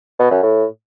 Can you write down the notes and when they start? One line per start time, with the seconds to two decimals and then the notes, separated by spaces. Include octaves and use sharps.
0.19 B2
0.31 F#2
0.43 A2